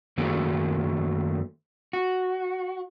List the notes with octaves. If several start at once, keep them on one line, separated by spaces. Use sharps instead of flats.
F#2 D#3 A3 A#3 F#4 G#4
F#4